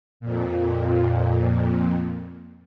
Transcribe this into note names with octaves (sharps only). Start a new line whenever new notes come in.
F2 A#2